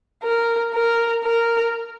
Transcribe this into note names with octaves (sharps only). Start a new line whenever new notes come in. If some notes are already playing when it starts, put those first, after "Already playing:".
A#4
A#4
A#4